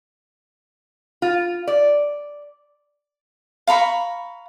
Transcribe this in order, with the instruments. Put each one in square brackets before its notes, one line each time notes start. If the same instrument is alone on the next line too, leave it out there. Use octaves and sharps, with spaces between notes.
[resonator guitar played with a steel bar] F4
D5
[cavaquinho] F5 A#5 B5 C#6